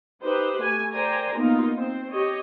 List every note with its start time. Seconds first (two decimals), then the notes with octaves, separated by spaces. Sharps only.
0.23 D#4 G4 B4 C5
0.62 A3 G#5
0.93 A#4 C5 D5 G5 G#5 A#5
1.36 A#3 B3 D#4 F4 A#4
1.78 C4 C5
2.11 G4 C#5 D#5